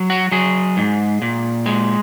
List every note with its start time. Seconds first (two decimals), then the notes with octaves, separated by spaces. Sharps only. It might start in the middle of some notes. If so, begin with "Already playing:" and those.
Already playing: F#3
0.10 F#4
0.32 F#3 G#4
0.77 G#2
1.22 A#2
1.66 G#3